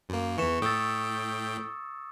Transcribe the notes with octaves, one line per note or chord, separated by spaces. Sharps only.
F#2 A#3
E2 E3 C#6 C#7 E7
A2 G5 D#6 E6 A6